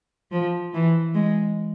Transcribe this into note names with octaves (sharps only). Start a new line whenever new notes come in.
F3
E3
G#3